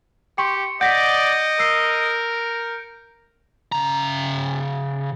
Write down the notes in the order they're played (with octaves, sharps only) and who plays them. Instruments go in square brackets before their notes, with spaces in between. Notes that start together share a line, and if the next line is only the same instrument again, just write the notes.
[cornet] G4 [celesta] G5 C6 C#6 [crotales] C#7
[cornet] D5 [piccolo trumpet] D#5 [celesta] F#5 A#6 B6 [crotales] G6 D7
[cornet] A#4 [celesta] E6 C7
[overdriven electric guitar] C#3 A#5